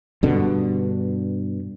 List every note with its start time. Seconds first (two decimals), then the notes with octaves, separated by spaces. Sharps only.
0.23 G2 B2 D3